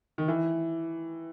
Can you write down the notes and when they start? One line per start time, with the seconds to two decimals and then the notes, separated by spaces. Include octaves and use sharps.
0.18 D#3
0.28 E3